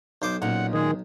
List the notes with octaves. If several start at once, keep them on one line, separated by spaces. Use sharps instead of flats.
B1 C5 D6
B1 A#2 C#4 F#5
D#3 G#3 G#4